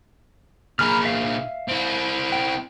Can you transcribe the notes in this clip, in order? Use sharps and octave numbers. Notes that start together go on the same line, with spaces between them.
A#2 G#4 A#5 B5 F6
E5 F5
C4 E4
G5